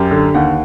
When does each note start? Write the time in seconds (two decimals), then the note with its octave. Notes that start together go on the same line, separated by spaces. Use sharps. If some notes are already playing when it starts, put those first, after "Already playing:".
Already playing: F#2 G4
0.11 D3
0.35 D#2 F#5